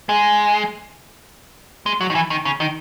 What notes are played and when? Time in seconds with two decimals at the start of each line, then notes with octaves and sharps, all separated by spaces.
0.09 G#3
1.86 G#3
2.01 F#3
2.10 D#3
2.15 E3
2.30 D#3
2.45 C#3
2.60 D#3